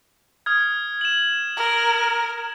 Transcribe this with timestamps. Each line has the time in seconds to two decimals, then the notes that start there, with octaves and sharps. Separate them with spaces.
0.46 D#6 F6 G#6
1.01 E7 F#7
1.57 A#4